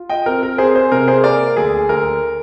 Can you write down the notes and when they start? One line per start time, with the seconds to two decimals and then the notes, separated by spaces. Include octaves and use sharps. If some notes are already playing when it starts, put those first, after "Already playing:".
Already playing: F4
0.09 D#5 G5
0.26 C4 A#4
0.43 A#4
0.58 C4 G#4 C5
0.75 G#4 C5
0.92 C3 A#4
1.08 G#4 C5
1.24 A#3 A#4 D5
1.56 D2 G#4
1.89 D2 A#4